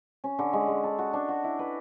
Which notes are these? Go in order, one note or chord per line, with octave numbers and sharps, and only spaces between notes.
C#4
D3
G#3
G#3
A4
F#4
D4
F#4
E4
B4